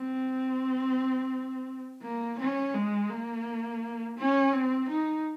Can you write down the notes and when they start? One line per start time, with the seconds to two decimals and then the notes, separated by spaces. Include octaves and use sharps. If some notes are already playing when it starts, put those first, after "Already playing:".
Already playing: C4
2.02 A#3
2.39 C#4
2.74 G#3
3.10 A#3
4.18 C#4
4.53 C4
4.89 D#4